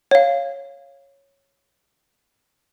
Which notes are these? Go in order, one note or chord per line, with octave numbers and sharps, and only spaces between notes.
C#5 F5